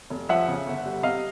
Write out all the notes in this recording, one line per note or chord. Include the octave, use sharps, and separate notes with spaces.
F1
F3 E5 F#5
C#3
G1
G3
C3 D#5 F5